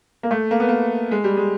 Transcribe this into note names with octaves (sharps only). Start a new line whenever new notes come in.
A#3
A3
A#3
B3
A#3
G#3
G3
G#3